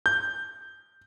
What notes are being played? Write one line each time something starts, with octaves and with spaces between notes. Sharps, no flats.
G6